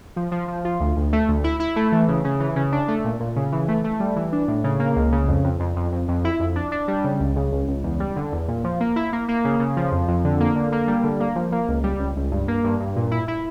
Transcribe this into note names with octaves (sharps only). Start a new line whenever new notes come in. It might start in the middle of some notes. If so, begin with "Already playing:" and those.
F3
F3
F3
F4
D2
D2
A3
D2
E4
E4
A3
E3
C#3
C#3
E3
C#3
D4
A3
A#2
A#2
C#3
E3
A3
A3
G3
E3
D4
A2
C#3
A#3
C#2
C#3
F2
F2
F2
F2
F2
F2
E4
F2
D4
D4
G3
C#3
C#2
C#3
C#2
C#2
E2
G3
D3
E2
A#2
F3
A#3
E4
A#3
A#3
C#3
C#3
F3
F2
F2
D3
A#3
D3
A#3
G3
D3
A#3
F3
A#3
C#2
G3
C#2
C#2
G2
A#3
G2
G2
A#2
E4
E4